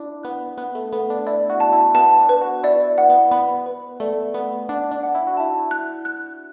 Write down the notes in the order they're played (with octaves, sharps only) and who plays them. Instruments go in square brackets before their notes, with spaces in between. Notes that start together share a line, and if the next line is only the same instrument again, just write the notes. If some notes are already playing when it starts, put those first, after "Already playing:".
Already playing: [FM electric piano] D4 E4 [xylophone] D6
[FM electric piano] B3 [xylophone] F#6
[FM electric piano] B3 [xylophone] F#6
[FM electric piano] A3
[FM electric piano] B3 [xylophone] A4
[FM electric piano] D4
[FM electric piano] E4 [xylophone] D5
[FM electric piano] F#4
[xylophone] A5
[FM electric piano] E4
[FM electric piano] B3 [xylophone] A5
[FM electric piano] D4
[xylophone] B4
[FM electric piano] F#4
[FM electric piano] E4 [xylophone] D5
[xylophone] F#5
[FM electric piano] B3
[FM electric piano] B3 [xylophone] B5
[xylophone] B4
[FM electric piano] A3 [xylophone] D5
[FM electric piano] B3 [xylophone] F#5
[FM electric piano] D4 [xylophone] F#5
[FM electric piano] D4
[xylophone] F#5
[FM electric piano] E4
F#4
[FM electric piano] E4 [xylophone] A5
[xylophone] F#6
F#6